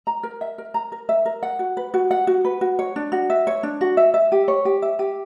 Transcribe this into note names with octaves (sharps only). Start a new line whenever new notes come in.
A#5
A#4
E5
A#4
A#5
A#4
E5
A#4
F#5
F#4
B4
F#4
F#5
F#4
B4
F#4
C#5
D4
F#4
E5
C#5
D4
F#4
E5
E5
G4
C#5
G4
E5
G4